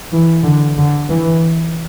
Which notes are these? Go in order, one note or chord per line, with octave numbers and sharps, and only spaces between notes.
E3
D3
D3
E3